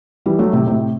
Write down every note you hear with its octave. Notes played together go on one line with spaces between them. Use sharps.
E3 G3
F#3 A3
A2 C3
A2 C3